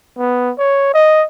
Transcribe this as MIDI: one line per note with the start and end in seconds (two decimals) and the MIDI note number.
0.18 0.52 59
0.58 0.90 73
0.94 1.25 75